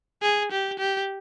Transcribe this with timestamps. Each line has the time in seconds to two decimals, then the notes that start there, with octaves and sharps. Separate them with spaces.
0.23 G#4
0.52 G4
0.79 G4